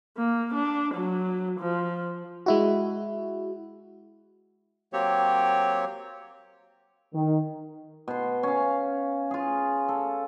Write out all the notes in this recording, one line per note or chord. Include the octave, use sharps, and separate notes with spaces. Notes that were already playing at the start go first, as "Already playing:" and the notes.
A#3
D4
F#3
F3
G#3 E4 F#4
F#3 A#3 C4 G4 C#5
D#3
B2 C6
C#4 F5
F4 G#4
A4